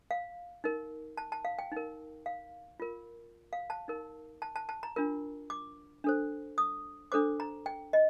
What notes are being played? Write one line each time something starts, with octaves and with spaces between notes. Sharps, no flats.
F5
D#4 A#4
A5
A5
F5
G5
D#4 A#4
F5
F4 A#4
F5
A5
D#4 A#4
A5
A5
A5
A#5
D4 F4 A#4
D6
D4 A4 C5
D#6
D4 A4 C5 D6
A#5
G5
D#5